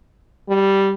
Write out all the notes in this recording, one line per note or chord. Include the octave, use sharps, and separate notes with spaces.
G3